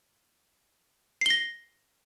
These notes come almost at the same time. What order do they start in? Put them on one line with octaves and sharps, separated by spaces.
C7 G7 A#6